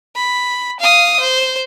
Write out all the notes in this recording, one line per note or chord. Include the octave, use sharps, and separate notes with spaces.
B5
F5 D#6
C5